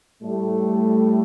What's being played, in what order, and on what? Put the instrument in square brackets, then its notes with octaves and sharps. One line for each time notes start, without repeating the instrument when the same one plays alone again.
[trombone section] A2 G3 A3